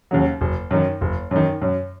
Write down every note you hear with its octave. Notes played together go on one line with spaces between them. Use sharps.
D#2 C#3 F#3
F#1
F#2 D#3
F#1
F#2 D#3
F#2